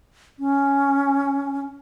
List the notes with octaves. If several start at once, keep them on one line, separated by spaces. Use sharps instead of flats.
C#4